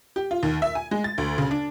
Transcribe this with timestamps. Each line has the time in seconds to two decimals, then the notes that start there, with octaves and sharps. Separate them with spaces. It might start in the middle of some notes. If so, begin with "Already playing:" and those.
0.16 G4
0.31 F4
0.43 D#2
0.62 E5
0.75 G#5
0.91 G#3
1.04 A6
1.18 D2
1.38 C#3
1.51 D4